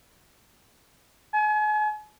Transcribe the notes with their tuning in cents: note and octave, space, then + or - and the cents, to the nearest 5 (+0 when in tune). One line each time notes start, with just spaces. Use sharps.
G#5 +40